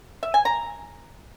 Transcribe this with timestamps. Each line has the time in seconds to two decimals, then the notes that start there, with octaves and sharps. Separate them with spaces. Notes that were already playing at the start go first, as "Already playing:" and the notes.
0.23 E5
0.34 G#5
0.45 A#5